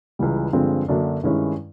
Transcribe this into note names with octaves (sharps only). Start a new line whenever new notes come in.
C#2 C#3 E3 G3
G2 D3 F3 G#3 C4
F#2 D3 F#3 A#3 D4
G2 D#3 G#3 C#4 E4